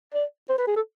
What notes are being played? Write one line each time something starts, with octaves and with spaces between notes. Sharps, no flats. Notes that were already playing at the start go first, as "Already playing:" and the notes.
D5
C5
B4
G#4
A4